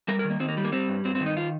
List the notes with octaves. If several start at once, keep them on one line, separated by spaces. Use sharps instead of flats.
G3 A#4
A#4
D#3
A#3
D#3 C4
A#3
G3
A#3
G3 C4
G2
G2 C4
C4
D#3
D#4
F4